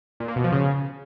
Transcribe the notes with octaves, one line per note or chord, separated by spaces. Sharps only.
A#2
A#3
B2
F3
C#3